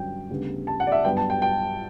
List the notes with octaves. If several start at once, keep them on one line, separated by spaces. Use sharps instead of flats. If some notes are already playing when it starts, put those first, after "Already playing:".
Already playing: G2 D3 F#3 C#4 G5
D2 C#3 G3 B3
A5
F#5
D5
E5
G2 F#3 B3 G5
A5
G5
G5